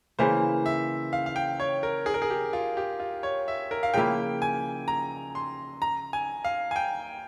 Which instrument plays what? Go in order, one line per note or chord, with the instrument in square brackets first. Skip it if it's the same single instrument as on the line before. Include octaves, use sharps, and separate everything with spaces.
[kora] C#3 E3 A#3 [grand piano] C5
[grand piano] E5
F5
F5
G5
C#5
A#4
G#4
A#4
G#4
G4
F4
G4
F4
C#5
E5
A#4
F5
[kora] C#3 F3 A#3 E4 [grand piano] G5
[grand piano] G#5
A#5
C6
A#5
G#5
F5
G#5
G5